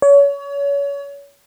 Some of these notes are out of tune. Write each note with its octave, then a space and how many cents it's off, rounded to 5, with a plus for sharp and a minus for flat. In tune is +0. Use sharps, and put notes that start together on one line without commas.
C#5 +30